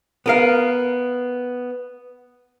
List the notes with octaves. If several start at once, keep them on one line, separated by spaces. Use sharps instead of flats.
B3 A#4 F5